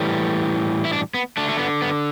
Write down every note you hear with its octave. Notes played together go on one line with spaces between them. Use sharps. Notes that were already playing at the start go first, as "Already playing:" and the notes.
Already playing: A2 E3 G3
E4
D4
B3
D3 A3 D4
A3
B3
B3